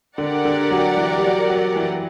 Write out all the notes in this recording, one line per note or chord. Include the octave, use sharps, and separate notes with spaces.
D3 G4 A#4 D5 F#5
D3
F#3
E3
G3
F#3
F#3
E3